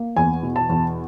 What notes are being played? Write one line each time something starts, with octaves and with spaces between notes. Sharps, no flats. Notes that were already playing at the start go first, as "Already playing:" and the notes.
Already playing: A#3
E2 G#5
B2
A5
E2